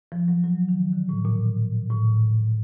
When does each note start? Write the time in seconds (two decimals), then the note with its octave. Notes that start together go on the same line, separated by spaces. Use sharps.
0.12 F3
0.28 F#3
0.44 F#3
0.69 D#3
0.93 D3
1.09 A2
1.25 A#2
1.90 A2